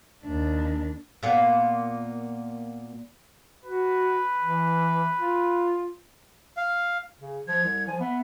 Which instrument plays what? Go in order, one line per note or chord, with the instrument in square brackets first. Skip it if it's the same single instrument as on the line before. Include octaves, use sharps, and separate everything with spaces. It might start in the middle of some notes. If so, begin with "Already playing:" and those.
[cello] D#2 D4
[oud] A#2 A#3 B3
[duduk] F#4 [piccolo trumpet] B4
[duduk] E3
F4
[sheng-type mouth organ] F5
[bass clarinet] C#3
[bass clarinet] F3 [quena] G#6
[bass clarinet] C2
[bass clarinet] F3 [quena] G#5
[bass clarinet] B3 [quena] E5